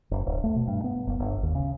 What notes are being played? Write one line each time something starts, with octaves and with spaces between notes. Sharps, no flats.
F#1
D1
A3
B2
G2
B3
F#1
G1
D#2
C#3